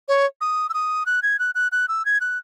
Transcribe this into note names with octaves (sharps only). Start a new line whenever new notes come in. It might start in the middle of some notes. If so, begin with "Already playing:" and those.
C#5
D#6
E6
D#6
F#6
G#6
F#6
F#6
F#6
E6
G#6
F#6